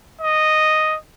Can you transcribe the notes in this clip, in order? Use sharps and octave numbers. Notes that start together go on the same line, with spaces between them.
D#5